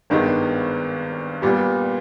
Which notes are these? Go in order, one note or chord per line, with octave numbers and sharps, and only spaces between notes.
G#1 G2 D#3 G#3 B3
A#2 G3 B3